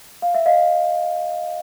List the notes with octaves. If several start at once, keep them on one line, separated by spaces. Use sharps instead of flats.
F5
E5
D#5 F5